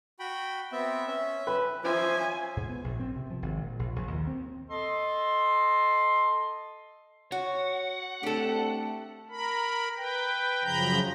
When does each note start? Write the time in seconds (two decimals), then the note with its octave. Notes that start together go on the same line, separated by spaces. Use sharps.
0.19 F#4 G5 B5
0.72 B3 C4 E5
1.07 C#4 E5
1.47 B4
1.84 F3 C#4 C5 E5 G#5
2.57 G#2
2.69 B3
2.84 A#1
3.00 C4
3.16 C3
3.30 F3
3.42 G#1
3.62 A#2
3.79 A#1
3.96 A#1
4.08 D#2
4.27 C4
4.70 A4 D#5 C6
7.32 F#4 C#5 F#5
8.23 A3 C4 D4 G4 A4
9.30 A#4 B5
9.96 B4 G5
10.64 F#2 C#3 F3 A#5 B5 G6